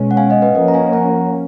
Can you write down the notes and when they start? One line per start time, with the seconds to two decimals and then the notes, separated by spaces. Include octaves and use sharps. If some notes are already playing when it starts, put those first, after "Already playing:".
Already playing: B2 G#3 C#4
0.11 F#5
0.17 F5 G#5
0.30 D#5 F#5
0.42 B4 D#5
0.55 F3 A#3 C#4 D#5 F#5
0.68 A#5
0.74 F5 G#5
0.93 F#5 A#5